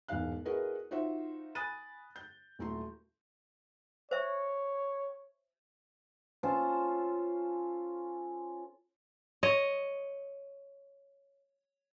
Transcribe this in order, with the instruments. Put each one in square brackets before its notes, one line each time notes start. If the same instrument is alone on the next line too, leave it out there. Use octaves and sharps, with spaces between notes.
[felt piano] E1 E2 G#2 D#4 F5 F#6
E4 F#4 G#4 A#4 B4 D#5
D#4 F4 F#4 C5 E5
G#5 B5 D#6 F#6 A6 D#7
G6
D#1 F#3 A3 E4 A#5 C6
[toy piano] C5 E5 [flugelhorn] C#5
[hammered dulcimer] C#4 F4 A4 C5
[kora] C#5 D#5